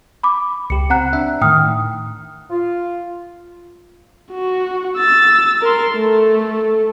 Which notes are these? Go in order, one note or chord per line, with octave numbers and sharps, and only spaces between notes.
B5 D6
C#2 G4 C#7
C4 F#5 A#5 F#6
D4 E5
A2 D#3 G5 D#6 F6
F4
F#4
E6 A6
A#4 C6
A3 A4